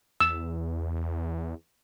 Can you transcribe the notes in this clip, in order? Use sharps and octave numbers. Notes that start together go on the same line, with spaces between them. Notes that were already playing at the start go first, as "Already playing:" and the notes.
E2 E6